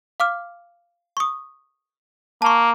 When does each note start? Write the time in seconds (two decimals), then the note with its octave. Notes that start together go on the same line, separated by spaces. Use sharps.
0.20 F5 D6 F6
1.17 C#6 D#6
2.42 A#3 A5 C#6